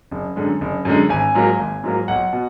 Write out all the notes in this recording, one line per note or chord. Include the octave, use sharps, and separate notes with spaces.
F#1
F#2 D3 G#3
F#1
F#2 D3 G#3
G#1 G#5
G#2 F#3 A#3
G#1
G#2 F#3 A#3
B1 F#5
B2